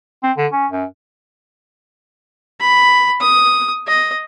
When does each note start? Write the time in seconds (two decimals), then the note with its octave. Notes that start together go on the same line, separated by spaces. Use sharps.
0.23 C4
0.37 D3
0.52 C#4
0.72 F#2
2.61 B5
3.21 D#6
3.88 D#5